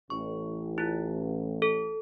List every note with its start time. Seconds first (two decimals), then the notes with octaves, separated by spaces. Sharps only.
0.10 A1 C#6
0.78 E4 F4
1.62 A4